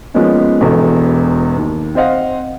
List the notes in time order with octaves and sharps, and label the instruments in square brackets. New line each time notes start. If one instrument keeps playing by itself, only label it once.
[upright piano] F3 G#3 A#3 B3 C#4 D#4
E1 E2 F#4 A4
D#2
C4 C5 D#5 F5 F#5